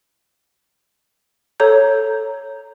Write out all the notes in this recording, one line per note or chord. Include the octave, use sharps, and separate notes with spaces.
A4 C#5 A#5 G6